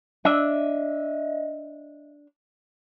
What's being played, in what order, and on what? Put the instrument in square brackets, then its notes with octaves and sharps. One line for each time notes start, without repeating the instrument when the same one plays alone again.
[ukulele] D4 [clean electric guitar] D#5 E5